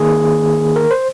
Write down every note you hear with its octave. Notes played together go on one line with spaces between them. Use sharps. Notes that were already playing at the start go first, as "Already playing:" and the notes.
Already playing: D#3 A#3 G#4
A#4
C5